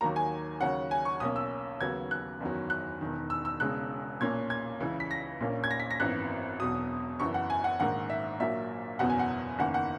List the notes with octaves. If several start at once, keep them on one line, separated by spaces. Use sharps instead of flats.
D#2 D#3 F#3 A#3 A#5
G#5
D#2 C#3 F#3 C#4 F#5
G#5
C#6
B1 B2 A#3 C#4 D#6
E6
D#2 C#3 F#3 B3 G#6
F#6
F#1 E2 D#3 F#3
F#6
E1 E2 D#3
E6
E6
E1 E2 C#3 G#3 F#6
B1 A#2 A#3 C#4 G#6
G#6
C#2 C#3 E3
B6
A#6
A#1 A#2 A#3 C#4
G#6
A#6
B6
A#6
G#1 F#2 E3 B3 F#6
E1 E2 B2 F#3 D#6
F#1 F#2 E3 B3 C#6
F#5
G#5
F#5
A#1 G#2 D#3 A#3 F#5
E5
A#1 A#2 F#3 A#3 E5
F#1 E2 B2 F#3 B3 F#5
G#5
F#5
F#1 E2 D#3 A#3 F#5
F#5